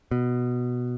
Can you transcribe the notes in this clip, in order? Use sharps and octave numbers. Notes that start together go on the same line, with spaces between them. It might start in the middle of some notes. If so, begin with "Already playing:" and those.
B2